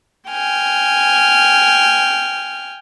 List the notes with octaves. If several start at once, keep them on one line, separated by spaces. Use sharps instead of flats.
G5 G#5 F6